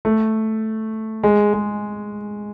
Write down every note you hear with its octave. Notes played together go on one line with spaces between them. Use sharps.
A3
G#3
G#3